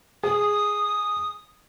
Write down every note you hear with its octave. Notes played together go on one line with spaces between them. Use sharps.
G#4 D#6